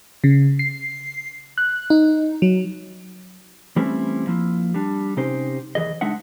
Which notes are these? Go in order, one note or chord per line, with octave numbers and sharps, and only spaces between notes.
C#3
C7
F#6
D#4
F#3
E3 G3 A3 C4 C#4 E4
F3 A#3 E4
G3 D4
C3 C#4 D#4 G4 C5
D#2 E3 G#4 D#5
C#2 G#3 D4 D#4 E5 F#5